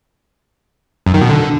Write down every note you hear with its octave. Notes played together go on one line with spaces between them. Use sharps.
F#2
D#3
B2
D3